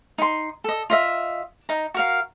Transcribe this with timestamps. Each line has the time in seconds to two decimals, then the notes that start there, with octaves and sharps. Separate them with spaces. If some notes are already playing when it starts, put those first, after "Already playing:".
0.18 D#4 C6
0.64 A4 D#5
0.90 F4 D#5 E5
1.69 D#4 A#5
1.94 F#4 A#4 F5